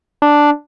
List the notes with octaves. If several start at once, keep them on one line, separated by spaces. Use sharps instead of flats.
D4